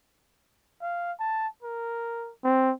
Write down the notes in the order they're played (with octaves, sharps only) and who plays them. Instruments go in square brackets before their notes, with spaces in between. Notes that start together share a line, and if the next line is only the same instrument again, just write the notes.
[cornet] F5
A5
A#4
[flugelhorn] C4